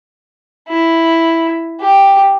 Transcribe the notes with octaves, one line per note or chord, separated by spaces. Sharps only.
E4
G4